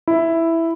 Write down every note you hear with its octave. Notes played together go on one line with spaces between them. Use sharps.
E4